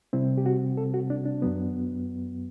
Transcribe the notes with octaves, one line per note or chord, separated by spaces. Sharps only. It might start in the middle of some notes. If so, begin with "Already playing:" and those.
C3 G3 C4 E4
G4
F#4
A4
F#4
D4
D4
F#2 F#3 B3